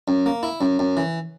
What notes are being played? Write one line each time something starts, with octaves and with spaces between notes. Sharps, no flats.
F#2
A#3
E4
F#2
F#2
E3